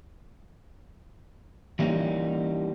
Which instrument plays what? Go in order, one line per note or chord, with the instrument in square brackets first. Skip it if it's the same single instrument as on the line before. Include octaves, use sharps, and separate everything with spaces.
[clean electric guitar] E3 G3 A#3 C#4 D#4